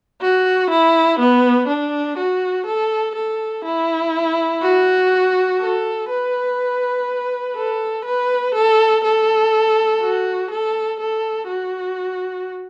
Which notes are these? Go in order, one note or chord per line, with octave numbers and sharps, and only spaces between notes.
F#4
E4
B3
D4
F#4
A4
A4
E4
F#4
A4
B4
A4
B4
A4
A4
F#4
A4
A4
F#4